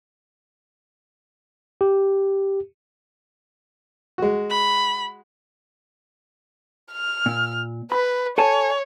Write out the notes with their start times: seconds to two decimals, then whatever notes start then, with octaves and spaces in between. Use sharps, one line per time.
1.81 G4
4.18 G#3 F#4
4.50 B5
6.92 F6
7.26 A#2
7.92 B4 B5
8.38 A4 C#5 G#5 A5